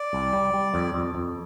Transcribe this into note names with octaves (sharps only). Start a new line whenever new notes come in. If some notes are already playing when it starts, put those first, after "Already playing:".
Already playing: D5
C2
G3
G3
F2
F2
F2